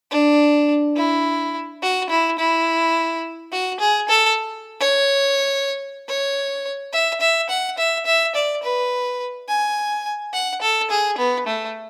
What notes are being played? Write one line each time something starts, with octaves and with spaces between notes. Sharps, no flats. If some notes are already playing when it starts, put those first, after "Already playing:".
D4
E4
F#4
E4
E4
F#4
G#4
A4
C#5
C#5
E5
E5
F#5
E5
E5
D5
B4
G#5
F#5
A4
G#4
B3
A3